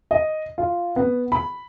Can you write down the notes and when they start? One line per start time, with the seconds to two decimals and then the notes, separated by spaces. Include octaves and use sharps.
0.11 D#5
0.58 F4
0.96 B3
1.32 B5